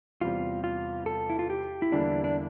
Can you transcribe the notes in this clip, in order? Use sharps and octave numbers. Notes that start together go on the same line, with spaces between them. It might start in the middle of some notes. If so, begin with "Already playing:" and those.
E2 C3 G3 F4
F4
A4
E4
F4
G4
E4
E2 D3 G3 A#3 D4 E4
D4